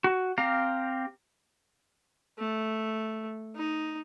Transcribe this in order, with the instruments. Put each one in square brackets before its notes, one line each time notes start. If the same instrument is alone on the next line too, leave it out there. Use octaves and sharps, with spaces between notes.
[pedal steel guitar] F#4
C4 G4 F5 A#5
[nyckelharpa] A3
D#4